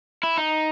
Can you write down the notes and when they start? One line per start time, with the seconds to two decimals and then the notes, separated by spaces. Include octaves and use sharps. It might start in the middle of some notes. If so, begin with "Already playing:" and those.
0.23 E4
0.38 D#4